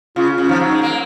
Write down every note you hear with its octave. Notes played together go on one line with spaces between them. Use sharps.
C#3 F4
C#3
F3 D#4
F#3
G#3
A#3